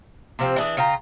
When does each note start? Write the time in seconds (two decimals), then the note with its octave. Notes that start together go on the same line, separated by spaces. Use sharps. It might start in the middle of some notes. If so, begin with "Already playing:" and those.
0.39 C3 F3 C4
0.56 E3 D4 G#4
0.77 C#3 F4 G5 A#5